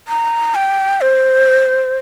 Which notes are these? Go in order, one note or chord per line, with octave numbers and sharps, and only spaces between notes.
A#5
G5
C5